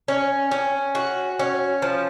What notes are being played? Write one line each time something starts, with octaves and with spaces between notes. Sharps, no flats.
C#4
C#4
F#4
C#4
F3